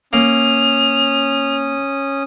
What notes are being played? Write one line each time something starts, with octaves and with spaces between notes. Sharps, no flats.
A#3 C#4 D#6 F7